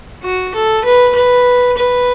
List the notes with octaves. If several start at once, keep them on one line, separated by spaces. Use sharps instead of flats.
F#4
A4
B4
B4
B4